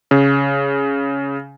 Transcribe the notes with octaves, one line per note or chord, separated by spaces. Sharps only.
C#3